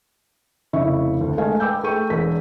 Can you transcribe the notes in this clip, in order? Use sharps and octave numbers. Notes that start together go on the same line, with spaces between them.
F1 C#3 E4 D#5 E5 C#6
D2
G#3 A3 F5 G#5
B4 G5 D6 E6 G6
A3 G#4 G5 C#6 D#7
E1 E2 G#4 B6